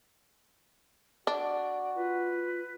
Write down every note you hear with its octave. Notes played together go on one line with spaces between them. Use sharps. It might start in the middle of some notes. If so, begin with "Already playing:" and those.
D4 F#4 D5
F4 B4